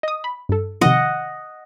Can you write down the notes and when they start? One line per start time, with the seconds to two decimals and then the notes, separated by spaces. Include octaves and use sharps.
0.03 D#5 D#6
0.24 B5
0.49 G2 A4
0.81 C3 D#3 F3 D#5 F#5